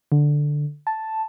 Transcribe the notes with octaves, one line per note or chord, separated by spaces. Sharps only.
D3
A5